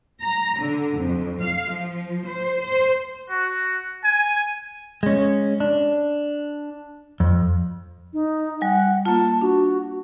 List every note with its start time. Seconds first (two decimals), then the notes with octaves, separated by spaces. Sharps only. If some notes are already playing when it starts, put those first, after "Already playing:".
0.22 A#5
0.58 D3
0.96 F2
1.40 F5
1.69 F3
2.26 C5
2.60 C5
3.30 F#4
4.05 G#5
5.03 G#3 C#4
5.60 D4
7.20 F2
8.13 D#4
8.61 G3 F#5 G#5
9.05 A#3 F4 A5
9.41 D4 F#4